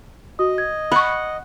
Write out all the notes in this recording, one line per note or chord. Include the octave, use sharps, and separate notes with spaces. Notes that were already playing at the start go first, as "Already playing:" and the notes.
F#4 D#5 D#6
G#6
F#5 B5 C#6